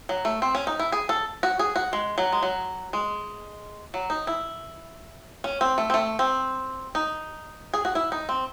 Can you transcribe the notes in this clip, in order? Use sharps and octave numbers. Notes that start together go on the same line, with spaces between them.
F#3
A3
C4
C#4
D#4
E4
G#4
A4
F#4
G#4
F#4
G#3
F#3
G#3
F#3
G#3
F#3
D#4
E4
C#4
C4
A3
C4
A3
C4
D#4
G#4
F#4
E4
D#4
C4